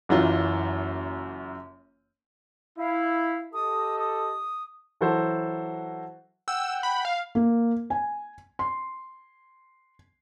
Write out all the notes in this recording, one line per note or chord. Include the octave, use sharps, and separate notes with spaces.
F#1 F#2 E3 F4
E4 F5
G4 A4 D#5 D#6
D#6
E3 F#3 E4 F#4 A4 C5
F#5 G5 E6
B5
F5
A#3
G#5
C6